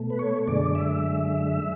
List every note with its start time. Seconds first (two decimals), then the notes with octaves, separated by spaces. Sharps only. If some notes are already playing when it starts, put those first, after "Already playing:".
Already playing: B2 A3
0.10 B4
0.19 C#5
0.47 F#2 D3 G#3 D5
0.75 E5